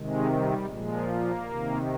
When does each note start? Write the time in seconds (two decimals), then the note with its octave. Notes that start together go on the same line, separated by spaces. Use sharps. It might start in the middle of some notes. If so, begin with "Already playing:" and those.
Already playing: C3 D#3 G#3
0.31 G3
0.70 A#2 F3 G#3
1.08 A#3
1.47 C3 D#3